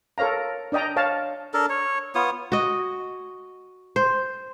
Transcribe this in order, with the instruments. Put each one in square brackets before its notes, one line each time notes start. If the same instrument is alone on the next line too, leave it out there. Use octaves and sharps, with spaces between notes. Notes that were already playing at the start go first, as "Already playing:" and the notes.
[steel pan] A4 A#4 C#5 F5 A#5
D4 D5 D#5 G5 A#5
C#5 F5 A5
[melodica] D4 A4 A#4
C#5
B3 F4 C#5 D#6
[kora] F#4 D#5
C5